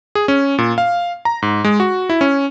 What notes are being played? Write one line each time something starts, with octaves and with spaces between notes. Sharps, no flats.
G#4
C#4
A#2
F5
A#5
G#2
G#3
F#4
E4
C#4